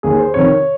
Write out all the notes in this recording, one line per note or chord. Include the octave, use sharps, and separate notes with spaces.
D#2 D#3 G#4
C5
F2 C3 D#3 C#5